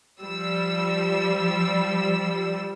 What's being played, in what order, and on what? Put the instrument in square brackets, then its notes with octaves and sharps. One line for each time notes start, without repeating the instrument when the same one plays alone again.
[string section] F3 G3 E6